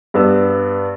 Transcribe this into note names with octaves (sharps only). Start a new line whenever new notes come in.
G2 B3 E6